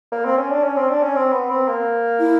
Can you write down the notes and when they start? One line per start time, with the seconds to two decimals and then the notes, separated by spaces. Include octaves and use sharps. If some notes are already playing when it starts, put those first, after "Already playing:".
0.12 A#3
0.25 C4
0.38 C#4
0.51 D4
0.64 C#4
0.76 C4
0.90 D4
1.03 C#4
1.16 C4
1.33 B3
1.50 C4
1.68 A#3
2.20 E4